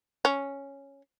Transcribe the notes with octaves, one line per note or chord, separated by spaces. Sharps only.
C#4